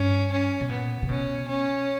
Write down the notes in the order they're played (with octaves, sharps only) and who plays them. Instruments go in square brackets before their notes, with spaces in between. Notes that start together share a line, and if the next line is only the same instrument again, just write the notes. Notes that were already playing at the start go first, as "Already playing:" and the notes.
Already playing: [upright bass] G2 [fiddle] C#4
[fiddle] C#4
[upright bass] B2
[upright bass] A#2 [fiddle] B3
[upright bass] C#3
[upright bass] B2 [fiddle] C#4
[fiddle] C#4